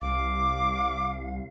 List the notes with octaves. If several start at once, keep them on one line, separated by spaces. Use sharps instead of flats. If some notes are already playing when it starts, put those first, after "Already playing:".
C2 F5 D6